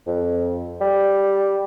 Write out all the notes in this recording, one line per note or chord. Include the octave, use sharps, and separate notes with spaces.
F2
G3